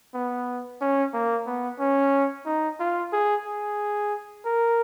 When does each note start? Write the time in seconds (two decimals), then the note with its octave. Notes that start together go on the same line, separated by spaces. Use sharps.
0.14 B3
0.81 C#4
1.14 A#3
1.46 B3
1.80 C#4
2.46 D#4
2.80 F4
3.13 G#4
3.45 G#4
4.46 A#4